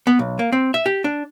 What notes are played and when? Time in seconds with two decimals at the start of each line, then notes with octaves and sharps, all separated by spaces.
0.07 B3
0.19 B1
0.39 A#3
0.52 C4
0.74 E5
0.86 G4
1.04 D4